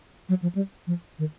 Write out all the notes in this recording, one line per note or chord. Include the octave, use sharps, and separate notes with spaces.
F#3
F3
G3
F3
D#3